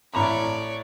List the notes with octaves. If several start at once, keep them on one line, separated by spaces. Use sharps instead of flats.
A1 C#5 D5 A#5 B5